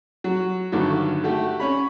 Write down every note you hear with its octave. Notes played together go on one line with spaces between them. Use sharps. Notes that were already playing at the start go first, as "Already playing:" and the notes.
F#3
G2 D3 D#3 F#3 A3
A3 F#4 G4 A4
C#4 C#5 B5